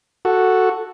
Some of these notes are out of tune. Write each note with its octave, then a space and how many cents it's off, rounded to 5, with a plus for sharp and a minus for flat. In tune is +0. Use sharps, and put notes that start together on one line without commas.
F#4 +0 A4 +0